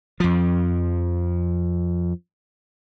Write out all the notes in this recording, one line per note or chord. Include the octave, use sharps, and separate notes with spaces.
F2 F3